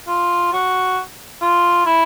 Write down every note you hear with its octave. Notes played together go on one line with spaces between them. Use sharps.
F4
F#4
F4
E4